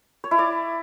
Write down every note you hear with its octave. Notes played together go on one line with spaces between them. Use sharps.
C#5
E4
D5